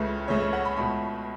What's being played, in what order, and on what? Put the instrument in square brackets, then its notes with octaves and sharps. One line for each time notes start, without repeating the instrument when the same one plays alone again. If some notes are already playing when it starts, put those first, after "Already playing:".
Already playing: [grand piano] C#2 C#3 A3 B4
C#2 C#3 A3 C#5
E5
F#5
B5
C#2 B2 A3 B5